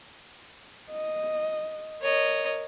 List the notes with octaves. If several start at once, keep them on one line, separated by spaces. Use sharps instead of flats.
D#5
A#4 C#5 D#5